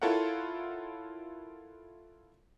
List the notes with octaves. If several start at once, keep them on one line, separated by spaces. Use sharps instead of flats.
E4 F4 A4 A#4 C#5 F#5